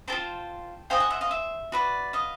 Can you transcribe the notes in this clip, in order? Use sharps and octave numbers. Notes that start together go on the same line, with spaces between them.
F4 A4 C5 G5 A5
G#4 C5 D#5 F5 G5
F#5 G#5
E5 F#5
D#5 F5
E5
F#4 B4 D5
D#5 F5